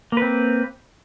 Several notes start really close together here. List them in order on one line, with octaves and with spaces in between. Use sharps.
A#3 B4 C4